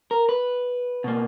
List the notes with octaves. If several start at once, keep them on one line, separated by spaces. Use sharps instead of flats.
A#4
B4
B2 A#3